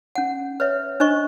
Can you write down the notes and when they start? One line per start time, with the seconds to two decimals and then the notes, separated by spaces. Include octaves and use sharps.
0.15 C#4 F#5
0.60 B4 C#5 E5
1.00 D4 C5 D#5 C#6